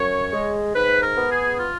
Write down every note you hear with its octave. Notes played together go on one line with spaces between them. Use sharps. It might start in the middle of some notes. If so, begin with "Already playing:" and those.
Already playing: F#2 C#5
G#3
G#2 B4
A#4
B3
G#4
F4